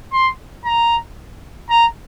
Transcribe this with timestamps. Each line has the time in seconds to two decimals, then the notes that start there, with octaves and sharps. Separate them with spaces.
0.13 C6
0.65 A#5
1.70 A#5